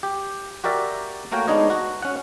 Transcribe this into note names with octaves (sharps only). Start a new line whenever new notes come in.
G4
F#4 G4 A#4 D5 E5
A3 A#3 F#4 A#4 C#5 G5
G#3 B3 D4 D#4 C#5 D#5
F#4
C#4 F#5